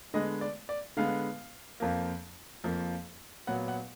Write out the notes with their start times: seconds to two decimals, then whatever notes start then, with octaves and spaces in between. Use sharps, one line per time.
0.14 D3 G#3 B3 D#5
0.41 D5
0.69 D5
0.97 D3 G#3 B3 F5
1.80 F2 F3 A#3
2.64 F2 F3 A#3
3.47 A#2 F#3 B3 F#5
3.68 F#5